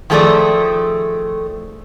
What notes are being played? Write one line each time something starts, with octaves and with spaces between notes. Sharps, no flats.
D#3 F3 A3 G#4 D5